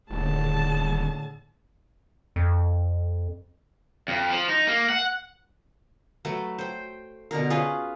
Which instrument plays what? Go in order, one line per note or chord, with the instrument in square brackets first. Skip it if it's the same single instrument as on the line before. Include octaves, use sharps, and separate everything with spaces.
[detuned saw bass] D#1 [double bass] A2 D3 [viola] G#4 A5
[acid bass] F2
[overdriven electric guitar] F2
F3
D#4
A#3
F#5
[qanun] F#3 A3 A4 B4
C5 G5
B2 D3 A#4
C#4 F4 G#4 B4